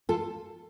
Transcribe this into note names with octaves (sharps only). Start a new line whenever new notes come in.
F4 A4